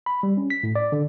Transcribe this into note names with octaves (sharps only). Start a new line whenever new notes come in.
B5
G3
C#4
B6
A2
D5
D3